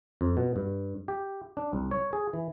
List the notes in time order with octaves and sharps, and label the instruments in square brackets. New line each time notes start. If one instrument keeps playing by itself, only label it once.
[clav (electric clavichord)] F2
B2
G2
G4
D4
C2
C#5
G#4
E3